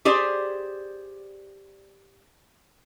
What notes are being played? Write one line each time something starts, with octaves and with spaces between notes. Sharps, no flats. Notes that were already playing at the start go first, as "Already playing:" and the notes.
G4 G#4 C5 D5